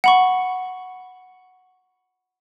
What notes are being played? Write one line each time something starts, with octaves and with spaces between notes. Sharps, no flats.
F#5 B5 C#6